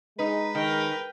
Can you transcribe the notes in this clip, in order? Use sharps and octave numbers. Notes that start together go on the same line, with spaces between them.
G#3 D#4 B4
D#3 A#4 G5